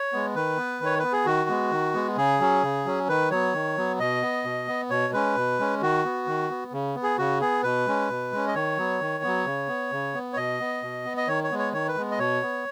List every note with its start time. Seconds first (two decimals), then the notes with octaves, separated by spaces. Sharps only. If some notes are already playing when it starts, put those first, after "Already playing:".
Already playing: C#5
0.13 G#3 B3
0.35 D#3 B4
0.58 B3
0.81 D#3 C#5
0.99 B3 B4
1.13 G#4
1.26 D#3 F#4
1.49 G#3 B3
1.72 D#3
1.94 G#3 B3
2.17 C#3 G#4
2.40 F#3 C#4
2.63 C#3
2.85 F#3 C#4
3.08 D#3 B4
3.31 F#3 B3 C#5
3.54 D#3
3.77 F#3 B3
3.99 B2 D#5
4.22 B3
4.45 B2
4.68 B3
4.90 B2 C#5
5.13 G#3 C#4 B4
5.36 B2
5.59 G#3 C#4
5.82 D#3 F#4
6.05 B3
6.27 D#3
6.50 B3
6.73 C#3
6.95 B3
7.03 G#4
7.18 C#3 F#4
7.41 B3 G#4
7.63 B2 B4
7.87 G#3 C#4
8.10 B2
8.32 G#3 C#4
8.47 D#5
8.55 D#3 C#5
8.77 F#3 B3
9.00 D#3
9.24 F#3 B3
9.46 C#3
9.68 B3
9.92 C#3
10.14 B3
10.33 C#5
10.37 B2 D#5
10.60 B3
10.83 B2
11.05 B3
11.17 D#5
11.28 D#3 C#5
11.44 C#5
11.50 G#3 B3
11.59 C#5
11.73 D#3 C#5
11.88 B4
11.96 G#3 B3
12.11 D#5
12.19 B2 C#5
12.42 B3